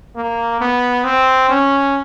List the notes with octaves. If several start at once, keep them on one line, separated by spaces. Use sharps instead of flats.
A#3
B3
C4
C#4